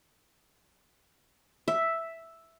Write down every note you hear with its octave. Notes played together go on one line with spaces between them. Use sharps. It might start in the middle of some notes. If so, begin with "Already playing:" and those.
E5